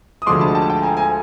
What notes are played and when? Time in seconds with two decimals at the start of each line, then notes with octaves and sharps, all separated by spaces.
0.22 D#6
0.26 D2 D3 F3 G#3 C6 D6
0.40 A5 B5
0.55 G5 A5
0.70 G5 A5
0.83 G#5 A#5
0.97 G#5 A#5